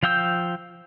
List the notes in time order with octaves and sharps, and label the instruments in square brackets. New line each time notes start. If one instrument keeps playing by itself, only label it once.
[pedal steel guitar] F3 F5 G5 E6 G6